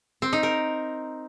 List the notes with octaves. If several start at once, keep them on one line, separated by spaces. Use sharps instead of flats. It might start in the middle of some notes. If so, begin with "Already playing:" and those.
C4
D#4
A#4